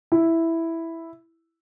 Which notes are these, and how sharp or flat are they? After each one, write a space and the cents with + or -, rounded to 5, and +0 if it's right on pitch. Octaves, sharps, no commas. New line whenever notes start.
E4 +0